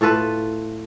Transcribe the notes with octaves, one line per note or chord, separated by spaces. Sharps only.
A2 F4 A4 B4